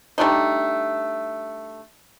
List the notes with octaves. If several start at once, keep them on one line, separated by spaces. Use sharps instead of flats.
G3 A3 D4 D#4